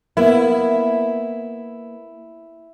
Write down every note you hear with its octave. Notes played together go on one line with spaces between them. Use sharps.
A#3 B3 E4